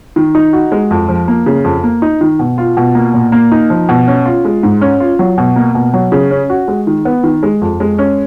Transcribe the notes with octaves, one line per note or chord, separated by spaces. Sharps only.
D#3
D#4
F#4
G#3
F2
F3
A#3
C#3
F2
A#3
D#4
D#3
B2
F4
B2
A#3
A#2
A#3
D#4
F3
B2
C#4
F4
G#3
G#2
C#4
F4
F#3
B2
A#3
B2
F#3
C#3
C#4
F#4
G#3
D#3
B3
D#3
G#3
F2
G#3
C#4